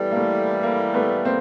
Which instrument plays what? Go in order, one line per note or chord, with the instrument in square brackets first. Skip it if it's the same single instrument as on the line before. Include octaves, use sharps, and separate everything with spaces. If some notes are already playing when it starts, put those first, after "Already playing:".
Already playing: [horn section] A2 E3 G3 [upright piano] A3 B3
[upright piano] A#3
A3
A#3
A3 B3
A#3 C4